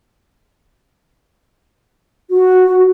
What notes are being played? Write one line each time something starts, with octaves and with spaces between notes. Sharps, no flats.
F#4